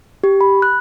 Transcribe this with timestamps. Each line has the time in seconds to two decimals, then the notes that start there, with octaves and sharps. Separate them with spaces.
0.24 G4
0.41 B5
0.62 F#6